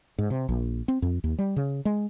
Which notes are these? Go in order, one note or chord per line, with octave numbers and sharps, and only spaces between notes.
G#2
C3
A#1
C4
F2
D#2
G3
C#3
G#3